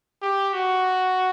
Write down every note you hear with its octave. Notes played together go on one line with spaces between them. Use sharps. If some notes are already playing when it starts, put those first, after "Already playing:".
G4
F#4